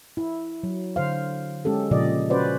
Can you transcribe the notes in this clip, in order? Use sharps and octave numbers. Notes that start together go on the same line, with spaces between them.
E4
F#3
D3 C5 F5
G#3 C#4 G4 A4
A#2 C#3 F3 D5 D#5
C#4 F#4 B4 C5 D5